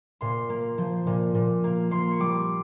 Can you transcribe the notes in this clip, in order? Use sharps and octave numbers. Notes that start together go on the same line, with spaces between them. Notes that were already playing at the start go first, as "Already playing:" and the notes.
A#2 C6
A#3
F3
A#2
A#2
A#3
A#3 C6
C#6
G3 D6